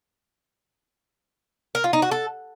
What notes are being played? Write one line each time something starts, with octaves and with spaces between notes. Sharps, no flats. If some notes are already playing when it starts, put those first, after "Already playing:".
A#4
F4
D#4
F#4
A4